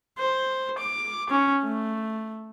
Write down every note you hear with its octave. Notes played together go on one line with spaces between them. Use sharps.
C5
D6
C#4
A3